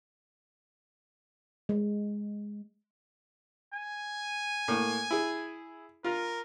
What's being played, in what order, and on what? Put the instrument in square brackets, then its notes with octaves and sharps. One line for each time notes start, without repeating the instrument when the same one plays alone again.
[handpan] G#3
[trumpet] G#5
[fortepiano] A2 A#3
E4 G#4
[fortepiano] F4 [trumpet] A#4